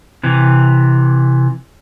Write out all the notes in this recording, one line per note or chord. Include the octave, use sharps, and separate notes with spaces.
C3 E3